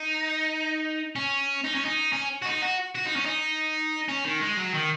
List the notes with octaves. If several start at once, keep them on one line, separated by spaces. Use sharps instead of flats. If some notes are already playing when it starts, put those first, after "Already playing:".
Already playing: D#4
C#4
D#4
C#4
D#4
C#4
F#4
D#4
F#4
F#4
D#4
C#4
D#4
C#4
D#3
G#3
F#3
D#3